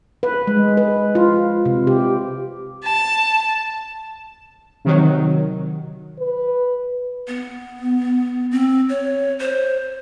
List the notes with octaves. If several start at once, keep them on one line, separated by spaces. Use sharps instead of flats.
B4
G#3
B4
F4
C3
G4
A5
C3 D#3 F#3
B4
B3
C4
C#5
C5